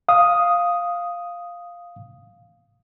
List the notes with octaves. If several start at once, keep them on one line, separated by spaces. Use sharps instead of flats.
F5 D#6